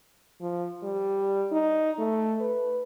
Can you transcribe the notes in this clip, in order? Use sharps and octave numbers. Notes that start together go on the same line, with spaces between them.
F3
G3
D#4
A3
B4